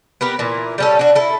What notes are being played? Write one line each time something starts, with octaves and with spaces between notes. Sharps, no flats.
B3 G4 A#4 B4
A#2 E3
G3 C#4 A4
D4 F#4
E4 A4